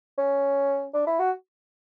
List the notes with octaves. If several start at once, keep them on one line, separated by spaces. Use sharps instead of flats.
C#4
D4
E4
F#4